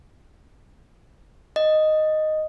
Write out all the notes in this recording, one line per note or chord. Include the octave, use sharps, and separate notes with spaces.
D#5